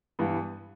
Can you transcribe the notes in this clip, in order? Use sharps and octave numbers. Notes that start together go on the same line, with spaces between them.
G2 E3 B3